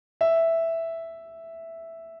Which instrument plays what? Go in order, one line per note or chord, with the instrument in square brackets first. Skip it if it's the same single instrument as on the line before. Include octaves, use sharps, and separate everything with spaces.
[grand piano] E5